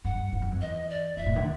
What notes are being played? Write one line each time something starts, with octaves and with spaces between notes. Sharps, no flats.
G2 F#5
G2
F#2
F2
E2 D#5
D5
F2 E5
A2
D3